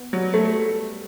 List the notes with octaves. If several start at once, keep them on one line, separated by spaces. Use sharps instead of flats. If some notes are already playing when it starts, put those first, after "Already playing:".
Already playing: B3
F#3 G3
A3